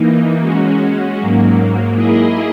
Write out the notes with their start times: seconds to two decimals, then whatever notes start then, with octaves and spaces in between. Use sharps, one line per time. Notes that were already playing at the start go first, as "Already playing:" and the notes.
Already playing: E3 A#3 D#4
0.39 G#3 C#4 F#4
1.17 G#2 F#3 A#3
1.93 A#3 E4 G#4 D#5